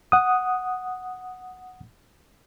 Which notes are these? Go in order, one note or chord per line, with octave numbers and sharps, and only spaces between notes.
F#5 D#6